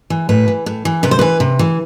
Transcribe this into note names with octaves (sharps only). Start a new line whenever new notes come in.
E3
A2 B4
E3
A2
E3
C3 B4
C5
E3 B4
C3
E3